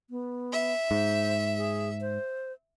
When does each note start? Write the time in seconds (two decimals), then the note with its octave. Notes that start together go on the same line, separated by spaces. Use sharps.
0.10 B3
0.52 E5
0.91 G#2 C5
1.57 G#4
2.01 C5